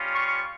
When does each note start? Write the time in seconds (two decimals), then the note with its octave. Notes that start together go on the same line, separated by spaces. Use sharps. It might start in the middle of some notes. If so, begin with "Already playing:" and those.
Already playing: G3 C#4 F4
0.14 C#6